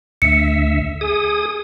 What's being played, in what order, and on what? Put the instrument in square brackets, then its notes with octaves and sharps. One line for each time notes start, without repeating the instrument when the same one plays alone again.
[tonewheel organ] D2 E5 [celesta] C#7
[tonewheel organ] G#4 D#6